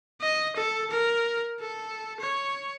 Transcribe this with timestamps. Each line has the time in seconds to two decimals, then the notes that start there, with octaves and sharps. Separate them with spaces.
0.21 D#5
0.56 A4
0.91 A#4
1.60 A4
2.20 C#5